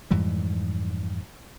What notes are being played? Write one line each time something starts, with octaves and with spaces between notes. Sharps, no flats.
F2 G#2 E3 G3